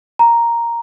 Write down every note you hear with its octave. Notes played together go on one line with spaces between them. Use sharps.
A#5